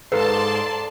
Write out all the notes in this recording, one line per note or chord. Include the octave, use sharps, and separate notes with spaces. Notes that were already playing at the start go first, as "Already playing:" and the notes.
G#2 A4 B4 D5 F5 A5 A#5 C6